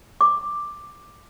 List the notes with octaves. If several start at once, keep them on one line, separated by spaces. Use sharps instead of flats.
D6